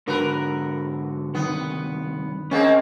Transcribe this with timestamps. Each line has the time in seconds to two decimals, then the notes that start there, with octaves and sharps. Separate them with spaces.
0.08 G#2 D3 F#4 A#4 B4
1.35 G2 C3 D#3 B3
2.51 G#3 A#3 C4 C#4